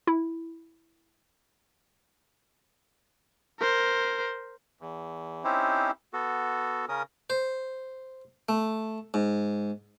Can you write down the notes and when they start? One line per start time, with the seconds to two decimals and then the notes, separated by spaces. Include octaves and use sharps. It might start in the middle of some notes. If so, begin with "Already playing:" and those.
0.07 E4
3.60 A#4 C5
4.81 E2
5.44 C4 C#4 D#4 E4 G4 C5
6.13 B3 F#4 A4
6.89 C#3 C#4 A#4 D#6
7.30 C5
8.49 A3
9.14 G#2